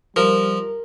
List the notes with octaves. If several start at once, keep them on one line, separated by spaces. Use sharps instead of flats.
F3 G3 A#4